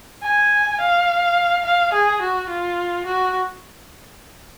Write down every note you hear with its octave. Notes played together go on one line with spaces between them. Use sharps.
G#5
F5
F5
G#4
F#4
F4
F#4